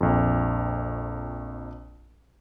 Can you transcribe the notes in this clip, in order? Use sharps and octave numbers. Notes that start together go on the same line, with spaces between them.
A#1 F2